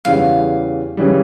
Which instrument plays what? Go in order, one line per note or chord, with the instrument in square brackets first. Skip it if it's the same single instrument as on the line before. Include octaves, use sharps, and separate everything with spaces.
[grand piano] E2 C#3 E3 G3 [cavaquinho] F5
[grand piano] C#3 E3 G3